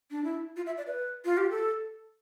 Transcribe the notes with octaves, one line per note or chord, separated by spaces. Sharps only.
D4
E4
F4
E5
D5
B4
F4
G4
A4